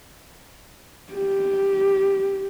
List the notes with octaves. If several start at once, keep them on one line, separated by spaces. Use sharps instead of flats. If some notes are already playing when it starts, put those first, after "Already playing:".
G4